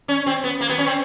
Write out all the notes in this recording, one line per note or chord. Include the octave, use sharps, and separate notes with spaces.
C#4
C4
B3
A#3
B3
C#4
C4